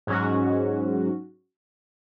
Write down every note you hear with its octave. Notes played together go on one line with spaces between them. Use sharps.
G#2 F#3 C#4 F#4